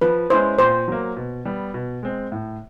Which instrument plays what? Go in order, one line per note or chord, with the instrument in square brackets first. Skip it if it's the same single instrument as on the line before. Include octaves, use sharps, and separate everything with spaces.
[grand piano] F3 [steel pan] B4
[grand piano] G#3 C#4 E4 [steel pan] C5
[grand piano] A#2 [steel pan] C5
[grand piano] F#3 A#3
B2
G3 B3
B2
G#3 C4
A2